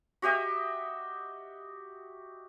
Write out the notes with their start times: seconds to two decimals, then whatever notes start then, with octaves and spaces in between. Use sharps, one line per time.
0.22 F#4 G4 D#5 E5